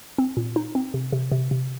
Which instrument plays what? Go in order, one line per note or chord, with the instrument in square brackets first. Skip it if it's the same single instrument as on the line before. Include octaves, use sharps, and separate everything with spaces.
[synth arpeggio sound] C4
A#2
D#4
C4
C3
C3
C3
C3